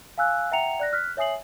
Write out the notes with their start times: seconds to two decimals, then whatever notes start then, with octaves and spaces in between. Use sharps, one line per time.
0.18 F5 G#5 E6 F#6
0.52 E5 F#5 G5 A#5 C#7 F7
0.80 D5 F#6 A#6
0.93 F6 F#6 B6
1.17 C#5 E5 G#5 D#6 C7 F#7